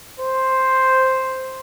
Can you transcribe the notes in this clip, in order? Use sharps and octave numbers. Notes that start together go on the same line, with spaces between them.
C5